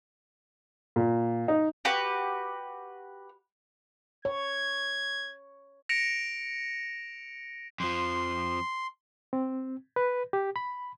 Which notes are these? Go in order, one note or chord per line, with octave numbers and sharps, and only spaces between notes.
A#2
D#4
F#4 G4 B4
C#5 G#6
A#6 C#7 D7 E7 F7
F2 F3 C6
C4
B4
G4
B5